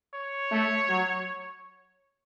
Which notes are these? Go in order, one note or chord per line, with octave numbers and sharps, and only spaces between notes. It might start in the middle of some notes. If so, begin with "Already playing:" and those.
C#5
A3
F#3